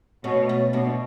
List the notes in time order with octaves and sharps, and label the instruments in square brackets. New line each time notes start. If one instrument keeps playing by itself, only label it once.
[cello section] B2 [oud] A3 C#4
[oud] A3 C#4
[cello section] B2 [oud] B3 D4